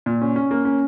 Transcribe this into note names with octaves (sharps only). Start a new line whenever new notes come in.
A#2
C#4
C#4
A#3
C#4